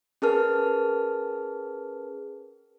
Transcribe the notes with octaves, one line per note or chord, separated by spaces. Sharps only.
C#4 G#4 A#4 B4 A5 F6